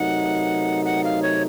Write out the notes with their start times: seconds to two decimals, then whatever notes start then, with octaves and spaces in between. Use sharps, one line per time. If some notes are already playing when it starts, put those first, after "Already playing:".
Already playing: C3 F#3 A3 D#4 A#4 F#5
0.85 F#5
1.04 F5
1.22 C#5